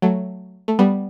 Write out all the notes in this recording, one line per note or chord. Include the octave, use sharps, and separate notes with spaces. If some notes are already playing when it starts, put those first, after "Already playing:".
F#3 A3
A3
G3 B3